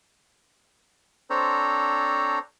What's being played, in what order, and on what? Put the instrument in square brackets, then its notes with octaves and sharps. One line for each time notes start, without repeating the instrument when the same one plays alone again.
[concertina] C4 D4 A4 C5 C#5 A#5